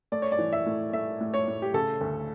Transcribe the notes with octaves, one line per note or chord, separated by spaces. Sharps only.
A3 D5
C#5
D5
E3
E5
A2
A3 E5
A2
C#5
A2
G4
C#3 A4
D2